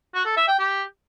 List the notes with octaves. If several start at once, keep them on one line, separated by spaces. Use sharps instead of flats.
F#4
A4
E5
G5
G4